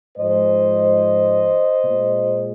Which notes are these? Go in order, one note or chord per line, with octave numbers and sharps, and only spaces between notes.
G#2 F3 G#3 C5 D#5
A#2 G#3